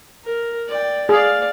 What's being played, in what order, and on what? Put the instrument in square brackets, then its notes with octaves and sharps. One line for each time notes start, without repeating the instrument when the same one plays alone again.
[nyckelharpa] A#4
D5 G5
[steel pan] G#4 [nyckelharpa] D5 F5